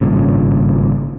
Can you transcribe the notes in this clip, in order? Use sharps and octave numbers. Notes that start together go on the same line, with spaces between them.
G#1 G2 A#2 C#3